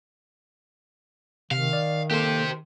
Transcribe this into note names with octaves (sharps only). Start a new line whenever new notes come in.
C3 D#3 F5
D5
A#3 G4 A4 C5